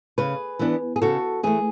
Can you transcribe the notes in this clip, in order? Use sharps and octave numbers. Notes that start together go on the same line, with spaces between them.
C#3 G#4 B4
E3 B3 D4
G#4
C#3 F#4 A4
E3 A3 G#4